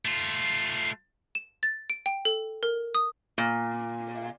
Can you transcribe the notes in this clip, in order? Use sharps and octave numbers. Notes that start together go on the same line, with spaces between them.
A3 F4
E7
A6
D7
G5
A4
A#4
D#6
A#2